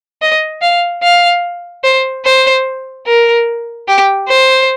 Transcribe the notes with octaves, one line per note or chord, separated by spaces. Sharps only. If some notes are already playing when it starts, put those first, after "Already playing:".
D#5
F5
F5
C5
C5
A#4
G4
C5